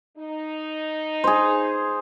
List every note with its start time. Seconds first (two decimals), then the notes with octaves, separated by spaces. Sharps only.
0.18 D#4
1.24 G#4 C5